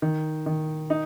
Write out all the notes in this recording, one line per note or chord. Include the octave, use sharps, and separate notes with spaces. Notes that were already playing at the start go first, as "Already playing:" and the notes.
D#3
D#3
D#4